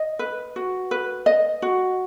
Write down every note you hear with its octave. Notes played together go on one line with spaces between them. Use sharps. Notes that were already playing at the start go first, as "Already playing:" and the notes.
Already playing: D#5
B4
F#4
B4
D#5
F#4